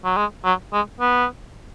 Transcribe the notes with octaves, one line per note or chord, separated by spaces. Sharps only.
F#3
G#3
F#3
G#3
B3